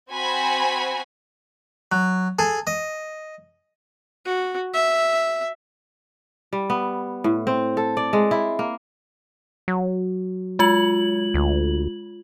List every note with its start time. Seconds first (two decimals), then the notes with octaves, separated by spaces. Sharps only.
0.11 C4 F#4 C5 G#5 B5
1.92 F#3
2.39 G#4 A4
2.67 D#5
4.26 F#4
4.74 E5
6.53 G3
6.70 B3
7.24 A2
7.47 C4
7.77 A4
7.97 D5
8.13 G#3
8.31 E4
8.59 A#3
9.68 F#3
10.59 G#3 F4 F#7
11.34 D2